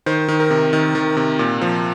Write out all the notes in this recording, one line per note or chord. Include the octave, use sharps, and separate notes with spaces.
D#3 C5
D#3
A#4
C3
D#3
D#3
C3
A#2
F3